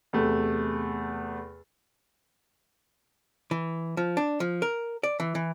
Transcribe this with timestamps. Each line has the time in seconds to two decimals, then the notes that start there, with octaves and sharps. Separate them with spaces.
0.13 E2 C3 A3
3.51 E3
3.97 F3
4.17 D4
4.40 F3
4.62 A#4
5.03 D5
5.20 E3
5.35 E3